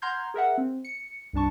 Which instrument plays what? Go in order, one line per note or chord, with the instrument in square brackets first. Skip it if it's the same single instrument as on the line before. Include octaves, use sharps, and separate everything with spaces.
[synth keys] F#5 A#5 C6 F6 G6 G#6
G#4 A#4 E5 F#5
C4
C#7
C2 G2 D4 A5 C#6